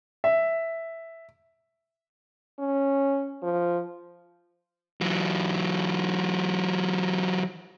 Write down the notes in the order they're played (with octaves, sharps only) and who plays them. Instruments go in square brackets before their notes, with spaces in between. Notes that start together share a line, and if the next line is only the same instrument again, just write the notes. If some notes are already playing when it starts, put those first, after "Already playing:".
[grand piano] E5
[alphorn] C#4
F3
[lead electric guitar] E3 F#3